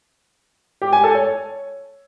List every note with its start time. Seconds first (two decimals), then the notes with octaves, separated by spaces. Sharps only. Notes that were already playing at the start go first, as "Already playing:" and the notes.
0.82 G4
0.93 G#5
1.04 A4
1.15 C#5